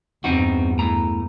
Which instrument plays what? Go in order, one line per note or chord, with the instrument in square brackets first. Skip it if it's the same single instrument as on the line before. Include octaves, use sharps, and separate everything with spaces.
[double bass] E2 G2 [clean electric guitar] C4 D#4 F#4
[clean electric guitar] A2 A#5